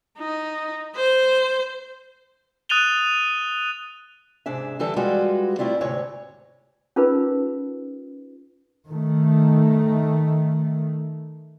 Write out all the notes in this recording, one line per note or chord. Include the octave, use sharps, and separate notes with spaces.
D#4
C5
D#6 F#6 A6 D#7 F7 G7
G#2 C3 D4 G#4 E5
D3 E3 G3 A4
G3 G#3 F4 F#4 B4
G3 A3 C4 E4 F4 D5
D2 G#2 C3 C#5
C#4 D#4 F4 G#4 A#4 B4
D#3 A3